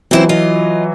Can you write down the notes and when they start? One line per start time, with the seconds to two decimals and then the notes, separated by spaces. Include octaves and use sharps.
0.11 E3 F#3 C4 E4 C5
0.29 F4 D#5